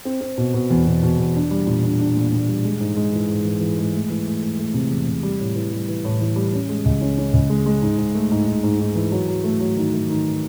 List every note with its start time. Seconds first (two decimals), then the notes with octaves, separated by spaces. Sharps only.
0.05 C4
0.21 C4
0.38 B2
0.54 B2
0.70 E2
0.85 B2
1.03 B2
1.18 E2
1.35 D4
1.51 G3
1.67 A#2
1.83 D4
1.99 D4
2.16 A#2
2.32 A#2
2.48 G3
2.65 G#3
2.80 G#2
2.97 G#3
3.13 E3
3.29 G#2
3.45 E3
3.61 E3
3.78 G#3
3.93 A3
4.10 E3
4.27 A3
4.42 A3
4.58 A3
4.74 C3
4.91 E2
5.07 C3
5.23 G3
5.40 A2
5.56 E3
5.72 G3
5.88 E3
6.04 A2
6.21 E3
6.36 G3
6.53 C#4
6.69 G#3
6.85 C#2
7.01 C#4
7.18 C#4
7.33 C#2
7.50 G#3
7.66 G#3
7.82 G#2
7.98 G#2
8.15 A3
8.31 G#2
8.47 G#2
8.63 G#2
8.80 G#2
8.95 E3
9.12 F#3
9.28 F#3
9.44 A3
9.60 F#3
9.76 D#3
9.93 A3
10.09 D#3